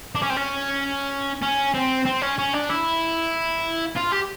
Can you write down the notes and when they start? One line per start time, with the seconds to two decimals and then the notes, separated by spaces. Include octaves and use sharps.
0.15 D4
0.22 C#4
0.30 C4
0.37 C#4
1.42 C#4
1.74 C4
2.06 C4
2.22 C#4
2.38 C#4
2.53 D4
2.69 E4
3.97 F4
4.12 G4